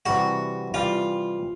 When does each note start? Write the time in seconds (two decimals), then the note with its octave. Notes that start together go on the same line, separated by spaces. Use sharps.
0.06 C3 E3 G3 F#4
0.74 C3 E3 G3 F4